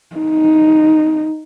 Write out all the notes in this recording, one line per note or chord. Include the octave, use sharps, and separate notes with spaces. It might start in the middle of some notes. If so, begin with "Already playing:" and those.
D#4